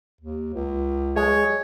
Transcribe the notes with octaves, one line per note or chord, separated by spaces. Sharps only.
D#2
C#2
G#3 C#5